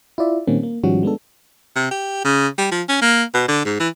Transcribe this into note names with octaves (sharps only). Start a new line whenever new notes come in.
E4 F4 D5 E5
A#2 D#3 G3 A#3 C4 C#4
A#3
G#2 D#3 F3 G3 C#4 F#4
G#3 B3 D4 A4
C3
G4
C#3
G3
F3
C#4
A#3
B2
D3
G#2
E3